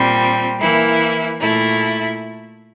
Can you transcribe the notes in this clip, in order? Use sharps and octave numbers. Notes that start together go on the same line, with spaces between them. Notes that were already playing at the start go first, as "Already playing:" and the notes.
Already playing: A#2 G3 C4
E3 A#3 E4
A#2 A3 E4